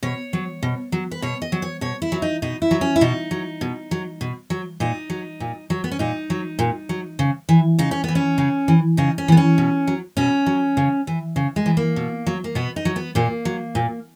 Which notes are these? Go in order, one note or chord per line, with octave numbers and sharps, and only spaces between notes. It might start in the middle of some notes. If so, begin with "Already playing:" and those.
B2 C#5
F#3
B2
F#3
B4
B2 C#5
D#5
F#3
C#5
B2 C#5
E4
F#3
D#4
B2 D#4
E4
F#3
C#4
E4
B2 D#4
F#3
B2
F#3
B2
F#3
A#2 D#4
F#3
A#2
F#3
B3
C#4
A#2 D#4
F#3
A#2
F#3
C#3
E3
C#3 D#4
C#4
E3 B3
C#4
C#3
E3
C#3 D#4
C#4
E3 B3
C#4
B2
F#3
B2 C#4
F#3
C#3
E3
C#3
G#3
E3
A#3
B2
F#3
A#3
B2 B3
D#4
F#3
B3
A#2 A#3
F#3
A#2